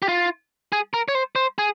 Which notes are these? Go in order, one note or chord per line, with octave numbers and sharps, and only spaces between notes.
G4
F4
G#4
A#4
C#5
C5
C5
G#4